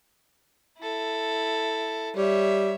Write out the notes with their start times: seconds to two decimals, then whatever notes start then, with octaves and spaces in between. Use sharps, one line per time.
0.80 E4 A4
2.17 G3 C#5 E5